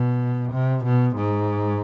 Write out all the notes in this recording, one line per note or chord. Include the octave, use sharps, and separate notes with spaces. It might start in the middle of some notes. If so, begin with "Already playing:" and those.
Already playing: B2
C3
B2
G#2